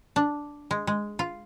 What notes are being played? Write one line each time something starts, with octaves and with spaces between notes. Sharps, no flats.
D4
G#3
G#3
F4